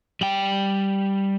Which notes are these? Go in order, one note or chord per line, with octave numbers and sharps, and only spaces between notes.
G3 G5